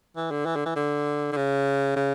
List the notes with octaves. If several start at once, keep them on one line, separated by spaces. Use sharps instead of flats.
E3
D3
E3
D3
E3
D3
D3
C#3
C#3